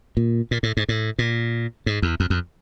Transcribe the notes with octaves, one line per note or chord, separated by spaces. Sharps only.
A#2
A#2
A2
G#2
A2
A#2
G#2
E2
F2
F2